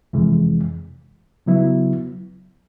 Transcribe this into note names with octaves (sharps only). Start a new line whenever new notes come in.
F2 C3 E3 G#3
C#3 F#3 B3 E4